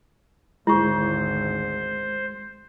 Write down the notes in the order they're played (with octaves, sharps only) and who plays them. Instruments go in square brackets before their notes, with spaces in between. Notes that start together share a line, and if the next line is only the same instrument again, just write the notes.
[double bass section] G#1 D2 [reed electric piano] G#3 [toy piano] E4 C#6 [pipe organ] C5